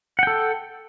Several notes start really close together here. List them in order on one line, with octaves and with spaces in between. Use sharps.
F#5 G5 A4